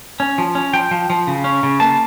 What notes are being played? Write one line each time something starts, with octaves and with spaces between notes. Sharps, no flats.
C#4
F3
C#4
F3 G5
F3
F3
C#3
C#4
C#3
A#3 A5